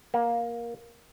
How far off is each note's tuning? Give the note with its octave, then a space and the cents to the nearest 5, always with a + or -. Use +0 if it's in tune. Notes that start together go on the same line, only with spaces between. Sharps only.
A#3 +15